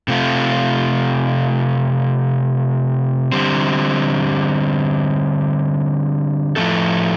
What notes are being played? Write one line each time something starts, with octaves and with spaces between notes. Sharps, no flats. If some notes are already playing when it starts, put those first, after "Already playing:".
C3 A3 F4
D3 G3 C4
A2 F3 A3 C4 A4